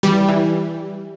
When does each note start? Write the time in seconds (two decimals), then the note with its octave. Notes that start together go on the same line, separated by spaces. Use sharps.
0.03 E3 G3
0.28 E3